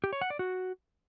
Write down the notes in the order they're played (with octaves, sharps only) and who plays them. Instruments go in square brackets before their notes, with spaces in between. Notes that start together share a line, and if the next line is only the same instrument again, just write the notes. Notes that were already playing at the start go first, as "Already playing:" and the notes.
[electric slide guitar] G4
C#5
F#5
D5
F#4